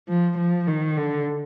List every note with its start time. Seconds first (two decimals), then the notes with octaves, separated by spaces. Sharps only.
0.08 F3
0.38 F3
0.68 D#3
0.97 D3